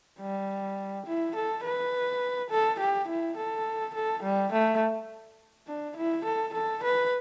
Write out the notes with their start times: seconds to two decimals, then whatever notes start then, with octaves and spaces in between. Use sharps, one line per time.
0.20 G3
1.06 E4
1.35 A4
1.64 B4
2.50 A4
2.80 G4
3.08 E4
3.37 A4
3.94 A4
4.23 G3
4.52 A3
5.67 D4
5.97 E4
6.25 A4
6.54 A4
6.84 B4